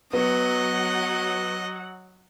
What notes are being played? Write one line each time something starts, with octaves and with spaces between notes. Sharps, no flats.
F#3 B3 D#5 F#5